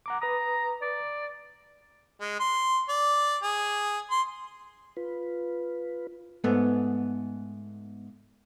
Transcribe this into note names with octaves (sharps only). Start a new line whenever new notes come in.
F#5 A#5 D6
B4 A#5 D#6
D5
G#3
C6
D5
G#4
C6
F4 B4
G#2 A3 B3